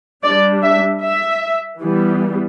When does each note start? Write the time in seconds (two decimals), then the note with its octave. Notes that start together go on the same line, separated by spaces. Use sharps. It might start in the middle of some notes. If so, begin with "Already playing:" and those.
0.24 G3 D4 D5
0.63 E5
1.02 E5
1.80 E3 G3 B3